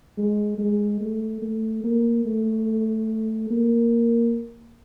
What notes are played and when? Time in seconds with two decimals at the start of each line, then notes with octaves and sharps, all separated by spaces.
0.18 G#3
0.58 G#3
1.01 A3
1.42 A3
1.84 A#3
2.26 A3
3.51 A#3